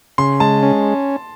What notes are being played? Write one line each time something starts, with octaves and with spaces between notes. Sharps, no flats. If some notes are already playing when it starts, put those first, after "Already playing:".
C#3 C6
G#3 A5
C#4